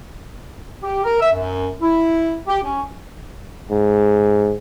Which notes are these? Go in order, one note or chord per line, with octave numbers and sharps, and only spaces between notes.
G4
A#4
E5
F#2
E4
G4
C#4
G#2